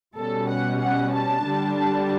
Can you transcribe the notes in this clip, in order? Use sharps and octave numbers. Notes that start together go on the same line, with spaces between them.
B2 G3 C#4 A4
F#5
F#5
A5
D3 G3 D4
A5